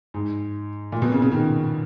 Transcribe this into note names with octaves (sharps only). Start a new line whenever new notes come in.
G#2
A#2
B2
C#3
C#3
D#3